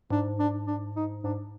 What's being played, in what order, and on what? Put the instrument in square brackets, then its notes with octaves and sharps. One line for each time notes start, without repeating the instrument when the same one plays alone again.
[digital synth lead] G#2 [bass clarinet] D4
[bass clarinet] D4
D4
D#4
[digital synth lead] G#2 [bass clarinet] D4